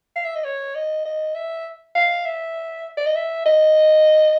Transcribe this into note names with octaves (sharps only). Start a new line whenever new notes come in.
F5
E5
D#5
C#5
D#5
D#5
E5
F5
E5
D5
D#5
E5
D#5